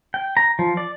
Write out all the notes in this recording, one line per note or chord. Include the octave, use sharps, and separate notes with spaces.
G5
A#5
F3
D5